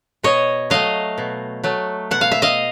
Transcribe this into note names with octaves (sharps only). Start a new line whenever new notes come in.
B2 C#5 D#5
F#3 A3 D#5 F5
B2
F#3 A3
B2 F#5
F5
E5
D#5 F5